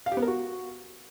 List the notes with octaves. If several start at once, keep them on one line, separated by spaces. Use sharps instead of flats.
F5
G4
B3
A#4
F#4